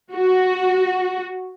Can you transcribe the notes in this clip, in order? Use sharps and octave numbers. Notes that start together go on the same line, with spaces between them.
F#4